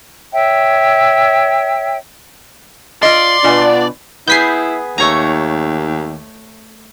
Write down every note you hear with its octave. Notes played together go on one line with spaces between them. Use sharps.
C#5 E5 G5
F4 D5 D#5 C6
B2 B3 D4 F4 G#5
B3 E4 G#4 G6 B6 C7
D#2 A3 C#5 A#5